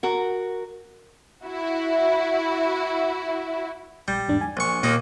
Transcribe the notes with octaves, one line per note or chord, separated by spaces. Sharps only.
F#4 A#4
E4 F#4
A#1 G3 G6
E2 G#2 D4
G#5
A#1 C#6
D#2 A#2 A#3 D#4